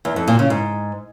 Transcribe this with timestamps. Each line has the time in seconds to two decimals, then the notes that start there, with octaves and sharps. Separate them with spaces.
0.05 E2
0.16 F2
0.28 A#2
0.39 C#3
0.50 G#2